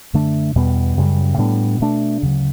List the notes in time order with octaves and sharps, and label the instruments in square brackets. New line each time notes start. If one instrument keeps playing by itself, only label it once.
[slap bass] F#2 D3 A3 D4
E2 B2 G3 B3
F#2 C#3 G3
A2 G3 B3 D4
B2 A3 D4
D2 C#3 F#3